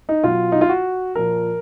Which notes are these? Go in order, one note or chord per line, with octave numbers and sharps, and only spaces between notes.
D#4
B2 F#3 F4
D#4
F4
F#4
A#2 F3 A#4